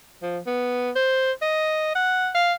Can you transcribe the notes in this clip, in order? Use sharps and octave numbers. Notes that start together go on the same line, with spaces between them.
F3
B3
C5
D#5
F#5
F5